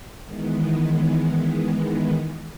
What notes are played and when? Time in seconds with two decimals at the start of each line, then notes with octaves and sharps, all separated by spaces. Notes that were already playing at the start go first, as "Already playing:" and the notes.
0.24 D#3 E3 G#3 B3